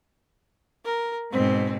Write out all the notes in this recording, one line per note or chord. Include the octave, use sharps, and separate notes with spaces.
A#4
G#2 B2 C4